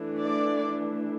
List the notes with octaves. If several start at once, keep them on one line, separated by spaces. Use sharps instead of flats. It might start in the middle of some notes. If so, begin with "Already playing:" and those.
Already playing: E3 A3 D4
D5